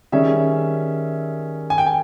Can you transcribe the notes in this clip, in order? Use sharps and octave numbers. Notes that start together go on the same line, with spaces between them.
D#3 G3 C#4 G#4 E5
G#5
G5
G#5